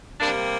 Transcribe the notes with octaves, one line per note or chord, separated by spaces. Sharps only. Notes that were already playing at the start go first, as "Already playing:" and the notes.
C3 G3 A#3 D4